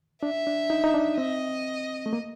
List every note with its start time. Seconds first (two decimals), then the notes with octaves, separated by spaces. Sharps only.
0.23 D4 E5
0.47 D4
0.70 D#4
0.84 D#4
0.94 D4
1.17 C4 D#5
2.06 A3
2.13 A#3